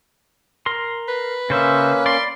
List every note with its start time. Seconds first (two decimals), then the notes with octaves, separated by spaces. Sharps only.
0.66 A#4 C6
1.08 B4
1.50 C#3 A#3 C#4 C5 E5
2.06 D5 B5 C6 D6